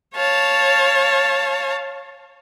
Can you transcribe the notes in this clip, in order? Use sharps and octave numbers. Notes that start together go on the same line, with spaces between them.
C#5 F5 A5